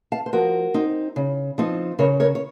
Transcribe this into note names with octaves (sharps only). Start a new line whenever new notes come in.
F5 A5
C5
F3 F#4 A#4
C4 D#4
C#3
F3 C4 D#4
C#3 A#4 C#5
A#4 C#5
C#5